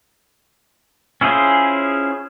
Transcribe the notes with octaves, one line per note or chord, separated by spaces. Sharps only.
C#4 E4 F4 G#4 C5